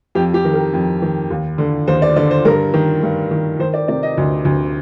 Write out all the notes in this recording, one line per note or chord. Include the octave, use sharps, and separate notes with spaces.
F2 G4
G4
D#3
A#4
F2
D#3
D#2
D3
D#2 C5
D5
D3 D5
C5
G2 A#4
D#3
G2
D#3
D#3 C5
D5
C3 D5
D#5
D2
D2